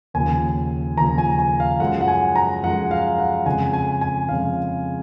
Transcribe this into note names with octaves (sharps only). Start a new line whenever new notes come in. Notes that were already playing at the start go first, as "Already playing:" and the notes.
D#2 C#3 F3 G#5
D#2 C#3 F3 A#5
G#5
G#5
F5
F#2 F3 G#3 F#5
F#5
G#5
A#5
F#2 F3 G#3 F#5
F5
F#5
F2 C#3 F3 G#3 G#5
G#5
G#5
F2 C#3 F3 G#3 F5